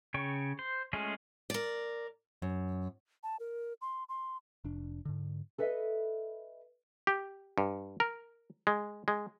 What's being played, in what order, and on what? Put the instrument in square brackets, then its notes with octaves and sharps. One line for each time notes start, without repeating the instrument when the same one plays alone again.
[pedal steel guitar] C#3 C#5 G5 C#6
C5
G#3 A3 C#4 F4 G#4
[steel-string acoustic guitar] A#4 D5
[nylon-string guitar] F#2
[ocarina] A5
A#4
C6
C6
[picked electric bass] F1 D4
G#2 D3
[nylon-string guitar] A4 B4 D#5 E5
[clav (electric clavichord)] G4
G2
A#4
G#3
G#3